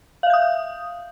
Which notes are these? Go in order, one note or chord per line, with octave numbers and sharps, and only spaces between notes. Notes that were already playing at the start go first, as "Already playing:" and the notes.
E5 F5 D#6 G6